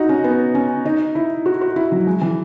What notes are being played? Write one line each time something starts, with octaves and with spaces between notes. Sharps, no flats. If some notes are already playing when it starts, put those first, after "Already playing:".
Already playing: D#4 F#4
C#4
B3
C#4
D#4
E4
F#4
F#4
E4
F#3
G#3
E3